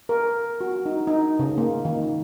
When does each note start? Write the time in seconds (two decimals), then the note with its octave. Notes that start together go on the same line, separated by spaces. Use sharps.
0.09 A#4
0.61 F#4
0.86 D#4
1.07 D#4
1.39 C#3
1.58 A#3
1.85 D#3